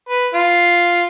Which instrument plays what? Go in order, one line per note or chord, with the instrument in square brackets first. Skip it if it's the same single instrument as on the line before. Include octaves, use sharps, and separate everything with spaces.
[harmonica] B4
F4